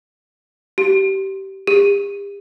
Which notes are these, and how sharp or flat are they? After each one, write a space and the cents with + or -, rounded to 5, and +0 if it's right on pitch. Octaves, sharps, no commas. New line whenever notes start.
G4 -25
G4 +45